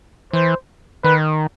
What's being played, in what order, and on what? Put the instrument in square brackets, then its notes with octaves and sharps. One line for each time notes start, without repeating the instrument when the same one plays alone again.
[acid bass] E3 [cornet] C5
[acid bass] D#3 [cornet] B4